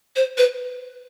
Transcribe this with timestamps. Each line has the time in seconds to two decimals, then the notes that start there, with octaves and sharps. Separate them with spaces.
0.16 C5
0.38 B4